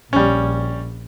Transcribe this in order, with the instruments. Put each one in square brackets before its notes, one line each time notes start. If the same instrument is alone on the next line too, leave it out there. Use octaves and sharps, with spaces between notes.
[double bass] A#1 [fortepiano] G3 C#4